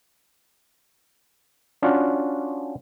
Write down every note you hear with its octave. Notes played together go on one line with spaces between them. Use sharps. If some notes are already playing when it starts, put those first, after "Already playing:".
C#4 D4 F4 F#4